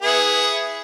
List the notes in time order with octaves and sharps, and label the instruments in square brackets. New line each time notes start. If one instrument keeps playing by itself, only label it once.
[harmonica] B3 E4 G#4